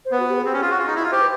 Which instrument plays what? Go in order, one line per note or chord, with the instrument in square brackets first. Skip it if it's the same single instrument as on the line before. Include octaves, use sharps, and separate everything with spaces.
[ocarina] C5
[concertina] B3 [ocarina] B4
[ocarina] F#4
G4
G#4
[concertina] C4
C#4
F4
F#4
F4
D#4
E4
F4
[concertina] G4 [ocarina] C5
[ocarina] B4